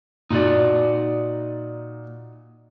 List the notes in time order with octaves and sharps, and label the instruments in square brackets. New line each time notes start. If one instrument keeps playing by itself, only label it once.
[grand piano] A#2 [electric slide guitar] D#4 F#4 D5